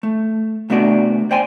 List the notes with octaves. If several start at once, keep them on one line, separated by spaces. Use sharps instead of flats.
A3
C3 A3 B3 D4 F#4 D5
C5 D5 G5 G#5 C6